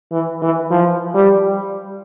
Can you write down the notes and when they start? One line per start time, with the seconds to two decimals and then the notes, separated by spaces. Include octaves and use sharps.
0.12 E3
0.42 E3
0.70 F3
1.14 G3